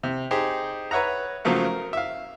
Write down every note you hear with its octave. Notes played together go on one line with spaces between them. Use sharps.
C3
D#4 G4 G#4 C5
B4 C#5 E5 F#5 A#5
C#3 F3 F#3 A3 A#3
A#4
E5 F5